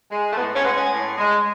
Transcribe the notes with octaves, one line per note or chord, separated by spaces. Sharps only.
G#3
A3
A2 B3
C#4
G#3 B3
C#4
A2
G#3